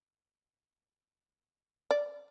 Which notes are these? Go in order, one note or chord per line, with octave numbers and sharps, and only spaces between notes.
D5